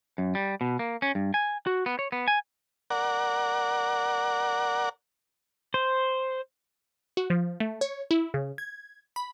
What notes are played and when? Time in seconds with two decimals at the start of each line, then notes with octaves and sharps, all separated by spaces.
0.18 F#2
0.35 G3
0.61 B2
0.79 A#3
1.02 C#4
1.15 G2
1.34 G#5
1.67 F#4
1.86 B3
1.99 C#5
2.12 B3
2.28 G#5
2.90 A#4 D5 F#5
5.74 C5
7.17 F#4
7.30 F3
7.60 A3
7.81 C#5
8.11 E4
8.34 C#3
8.58 G#6
9.16 B5